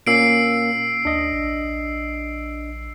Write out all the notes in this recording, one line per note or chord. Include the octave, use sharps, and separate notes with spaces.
A#2 A#3 C#4 E6 C7 D7
D2 D4 D#5
A#1